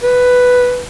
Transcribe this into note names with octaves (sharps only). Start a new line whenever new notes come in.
B4